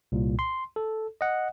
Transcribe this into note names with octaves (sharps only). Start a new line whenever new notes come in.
C2 A#2
C6
A4
D#5 F#5